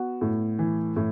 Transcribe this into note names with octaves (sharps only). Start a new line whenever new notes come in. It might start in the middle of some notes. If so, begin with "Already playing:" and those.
Already playing: B3 F#4
A2
E3
A2